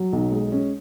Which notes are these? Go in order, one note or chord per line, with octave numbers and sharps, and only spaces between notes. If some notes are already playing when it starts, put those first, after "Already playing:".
Already playing: F#3
B1
G#3
C#4